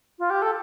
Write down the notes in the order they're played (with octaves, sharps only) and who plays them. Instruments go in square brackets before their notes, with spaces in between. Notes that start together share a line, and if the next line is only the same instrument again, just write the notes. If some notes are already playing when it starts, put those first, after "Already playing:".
[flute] F4
G4
A4